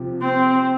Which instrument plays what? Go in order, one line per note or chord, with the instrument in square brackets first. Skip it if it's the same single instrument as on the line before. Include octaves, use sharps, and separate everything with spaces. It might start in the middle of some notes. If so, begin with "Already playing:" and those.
Already playing: [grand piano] C3 F3 G4
[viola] C4